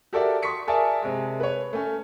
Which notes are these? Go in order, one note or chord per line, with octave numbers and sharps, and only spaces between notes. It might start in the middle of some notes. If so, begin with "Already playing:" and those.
F#4 G4 A4 A#4 D5 E5
C6 C#6 D#6 B6 C#7
G#4 A#4 D5 E5 G#5 A5
C3 G#3
B4 C#5
A3 C#4